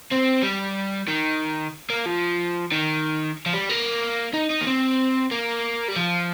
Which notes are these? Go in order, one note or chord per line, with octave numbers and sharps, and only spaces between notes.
C4
G3
D#3
A#3
F3
D#3
F3
G3
A#3
D#4
D#4
A#3
C4
A#3
G3
F3